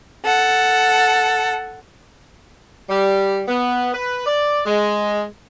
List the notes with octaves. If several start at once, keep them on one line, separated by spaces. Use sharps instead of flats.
A4 F#5
G3
B3
B4
D5
G#3